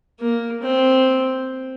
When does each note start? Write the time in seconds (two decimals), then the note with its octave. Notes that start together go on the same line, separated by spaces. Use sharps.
0.21 A#3
0.62 C4